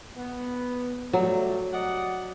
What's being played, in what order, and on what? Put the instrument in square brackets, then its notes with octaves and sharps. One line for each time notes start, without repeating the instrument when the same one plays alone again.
[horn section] B3
[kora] F#3 [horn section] G3 A3
[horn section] D5 D#5 F#5